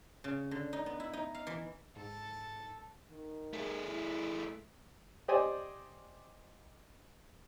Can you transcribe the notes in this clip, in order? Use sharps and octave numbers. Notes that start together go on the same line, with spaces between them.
C#3
D3
D#4
B3
E4
D#4
F5
E3
G#2 A4
D#3
A3 G#4
E4
G4 C5 D5 D#5 G5 G#5